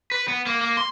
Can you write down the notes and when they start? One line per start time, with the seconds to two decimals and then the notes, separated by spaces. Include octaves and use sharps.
0.12 B4
0.28 B3
0.46 A#3
0.61 A#3
0.77 C6